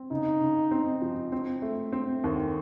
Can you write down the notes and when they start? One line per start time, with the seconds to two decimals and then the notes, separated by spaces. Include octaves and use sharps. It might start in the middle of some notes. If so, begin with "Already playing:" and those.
Already playing: C4
0.11 C#3 D#4
0.41 C#3
0.71 C4
1.02 F3
1.32 C4
1.62 A3
1.92 C4
2.24 D#2